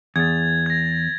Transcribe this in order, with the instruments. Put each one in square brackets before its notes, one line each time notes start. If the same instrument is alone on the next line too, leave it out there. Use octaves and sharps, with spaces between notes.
[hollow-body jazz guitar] E2 [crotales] G#6 A6
[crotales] G#6 A#6